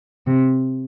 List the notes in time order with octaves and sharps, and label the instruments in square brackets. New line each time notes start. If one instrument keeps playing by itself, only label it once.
[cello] C3